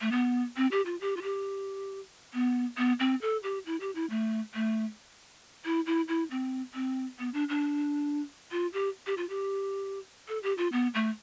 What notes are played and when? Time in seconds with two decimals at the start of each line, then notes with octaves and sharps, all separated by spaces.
0.01 A3
0.12 B3
0.57 C4
0.71 G4
0.86 F4
1.01 G4
1.17 F4
1.22 G4
2.34 B3
2.77 B3
3.00 C4
3.22 A4
3.43 G4
3.66 E4
3.80 G4
3.95 E4
4.10 A3
4.54 A3
5.65 E4
5.86 E4
6.08 E4
6.31 C4
6.75 C4
7.19 B3
7.34 D4
7.49 D4
8.52 F4
8.73 G4
9.07 G4
9.18 F4
9.29 G4
10.28 A4
10.43 G4
10.58 F4
10.72 B3
10.94 A3